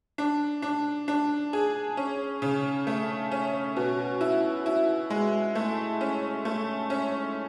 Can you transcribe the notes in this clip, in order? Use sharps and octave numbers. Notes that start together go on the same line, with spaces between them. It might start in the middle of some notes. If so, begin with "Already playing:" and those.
D4
D4
D4
G#4
C#4
C#3
A3
C#4
B2
E4
E4
G#3
A3
C#4
A3
C#4